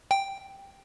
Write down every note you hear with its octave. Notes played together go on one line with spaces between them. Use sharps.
G5